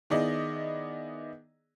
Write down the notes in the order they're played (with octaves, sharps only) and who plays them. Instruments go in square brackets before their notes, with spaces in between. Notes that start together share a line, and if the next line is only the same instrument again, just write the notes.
[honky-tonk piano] D#3 B3 E4 G#4 D5 D#5